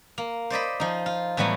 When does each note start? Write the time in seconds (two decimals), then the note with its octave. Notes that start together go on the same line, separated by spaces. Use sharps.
0.18 A#3
0.50 C5 D5 D#5 B5
0.80 F3 D#4
1.06 F4
1.37 A2 E3 F#3 G3 B3